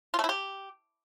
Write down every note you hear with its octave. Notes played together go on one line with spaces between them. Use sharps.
F4
A3
E4
G4